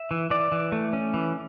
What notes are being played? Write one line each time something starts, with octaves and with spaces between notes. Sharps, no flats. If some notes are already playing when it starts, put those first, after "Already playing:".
Already playing: E5
E3
E3 D5
E3
A3
C#4
E3